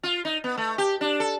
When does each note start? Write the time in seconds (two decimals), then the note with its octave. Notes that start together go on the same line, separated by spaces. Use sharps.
0.03 F4
0.25 D#4
0.44 B3
0.58 A3
0.78 G4
1.01 D4
1.20 A4